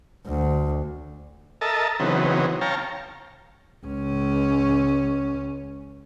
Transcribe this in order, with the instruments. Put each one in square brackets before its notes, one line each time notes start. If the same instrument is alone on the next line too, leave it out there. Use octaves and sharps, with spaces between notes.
[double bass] D2
[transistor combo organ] A4 A#4 D#5 E5 A5
C#3 E3 F#3 B3 C4 D#4
C#5 F5 G5 A5 A#5
[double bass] C#2 C#4